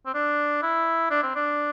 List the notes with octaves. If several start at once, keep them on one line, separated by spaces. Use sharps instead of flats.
C4
D4
E4
D4
C4
D4